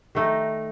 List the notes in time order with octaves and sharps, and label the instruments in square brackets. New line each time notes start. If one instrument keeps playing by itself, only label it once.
[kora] D#3 A3 D#4